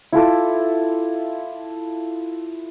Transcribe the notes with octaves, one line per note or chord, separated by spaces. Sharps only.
E4 F4 A4 D6